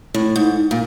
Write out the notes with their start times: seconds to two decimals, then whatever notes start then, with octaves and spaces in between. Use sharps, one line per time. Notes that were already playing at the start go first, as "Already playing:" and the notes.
0.14 A2
0.36 G#2
0.71 A#2